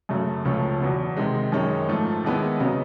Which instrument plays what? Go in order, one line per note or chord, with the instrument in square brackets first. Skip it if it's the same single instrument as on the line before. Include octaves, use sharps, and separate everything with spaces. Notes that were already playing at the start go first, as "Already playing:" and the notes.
[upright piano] F#2 C#3 F#3 A3
C#2 C#3 F3 A3 C#4
E2 B2 F#3 B3
C3 D#3 G#3
F#2 D#3 G#3 C#4
G#2 F3 A3
D#2 D#3 G#3 B3 E4
C#3 F#3 B3 D#4